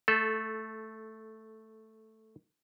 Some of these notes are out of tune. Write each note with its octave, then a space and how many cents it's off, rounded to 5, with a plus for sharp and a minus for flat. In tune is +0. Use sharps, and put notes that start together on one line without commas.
A3 +0 A4 -15